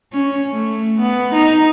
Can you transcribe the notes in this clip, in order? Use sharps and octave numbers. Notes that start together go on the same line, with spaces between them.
C#4
A3
B3
D#4